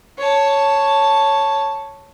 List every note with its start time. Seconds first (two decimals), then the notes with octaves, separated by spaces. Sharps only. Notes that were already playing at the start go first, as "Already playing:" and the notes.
0.18 C#5 A5